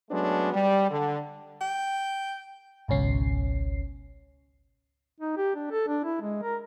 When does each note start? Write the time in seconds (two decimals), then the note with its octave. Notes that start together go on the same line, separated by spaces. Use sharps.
0.11 F#3 G#3 A3 B3 C#4 D4
0.53 G3
0.90 D3
1.61 G5
2.88 G#1 C#2 B2 C#4 C7
5.21 D#4
5.37 G4
5.56 D4
5.71 A4
5.88 D4
6.04 E4
6.22 G#3
6.42 A#4